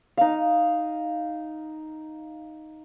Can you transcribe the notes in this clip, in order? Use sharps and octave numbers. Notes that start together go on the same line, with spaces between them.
D#4 F5